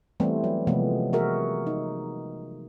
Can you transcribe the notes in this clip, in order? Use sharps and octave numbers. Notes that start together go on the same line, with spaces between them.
E3 G3 A3 B3 C4
F#3
C3 E3 F3 G#3 A3 B3
E3 F#4 G#4 A#4 E5
D#4